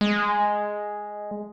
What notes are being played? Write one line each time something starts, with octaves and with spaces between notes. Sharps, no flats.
G#3